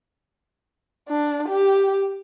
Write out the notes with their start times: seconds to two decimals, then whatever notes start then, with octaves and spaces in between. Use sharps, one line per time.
1.09 D4
1.49 G4